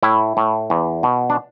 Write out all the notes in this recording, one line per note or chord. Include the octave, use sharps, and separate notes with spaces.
A2 E4
A2
E2
B2
D4